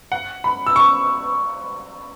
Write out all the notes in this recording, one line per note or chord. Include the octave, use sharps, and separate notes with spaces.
F#5
B5
E6
C#6